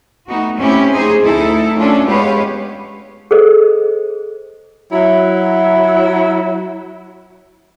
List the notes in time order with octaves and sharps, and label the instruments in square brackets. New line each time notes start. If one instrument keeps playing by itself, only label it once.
[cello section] A3 B3 D#4 F#4
A3 C4 C#4 E4 G4
A3 D#4 G#4 C5
D2 D#4 E4 A4
A3 C#4 D4 F4 A4
G#3 B3 G4 B4 C#5 F5
[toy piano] G#4 A4 C5 D#5
[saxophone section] F#3 E4